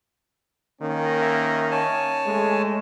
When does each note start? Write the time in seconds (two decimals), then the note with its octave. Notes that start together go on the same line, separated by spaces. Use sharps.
0.81 D#3 A#3 C#4
1.22 E5
1.71 C#5 G#5 A5
2.27 G#3 A3